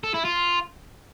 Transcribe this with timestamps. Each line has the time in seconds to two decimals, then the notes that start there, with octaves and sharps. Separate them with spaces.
0.04 A4
0.14 E4
0.25 F4